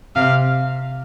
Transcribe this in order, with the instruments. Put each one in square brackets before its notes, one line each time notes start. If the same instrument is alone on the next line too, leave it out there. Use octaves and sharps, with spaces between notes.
[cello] C3 [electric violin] F5